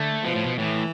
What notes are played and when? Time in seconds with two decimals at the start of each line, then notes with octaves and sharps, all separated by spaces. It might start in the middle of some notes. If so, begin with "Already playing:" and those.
Already playing: D3 A3
0.24 B2 F3
0.35 A2
0.45 B2
0.58 A2 E3